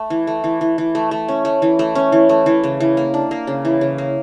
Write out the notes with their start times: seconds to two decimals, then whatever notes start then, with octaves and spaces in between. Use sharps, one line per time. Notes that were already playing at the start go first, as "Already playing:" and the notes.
Already playing: A3
0.10 E3
0.27 A3
0.44 E3
0.61 E3
0.78 E3
0.95 A3
1.11 A3
1.28 C#4
1.45 A3
1.62 E3
1.79 A3
1.95 C#4
2.12 E3
2.29 A3
2.46 E3
2.64 C#3
2.80 E3
2.97 A#3
3.14 D4
3.31 A#3
3.47 C#3
3.65 E3
3.81 C#3
3.98 A#3